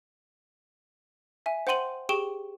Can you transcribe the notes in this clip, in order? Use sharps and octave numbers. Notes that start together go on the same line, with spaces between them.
E5 G#5
C5 F#5 G5 C6 D#7 F#7
G4 G#4 G5 C#6 E7 G7